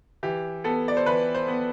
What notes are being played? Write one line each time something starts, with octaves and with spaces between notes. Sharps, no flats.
E3 G4
B3 A4
D5
C5
E3 B4
C5
B3